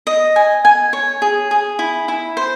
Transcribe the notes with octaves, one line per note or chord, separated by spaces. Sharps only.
D#5
G#5
G#5
C#5
G#4
G#4
E4
E4
C5